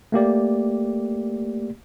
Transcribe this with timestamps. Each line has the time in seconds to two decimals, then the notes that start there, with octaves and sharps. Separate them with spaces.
0.12 A3 A#3 G4 D5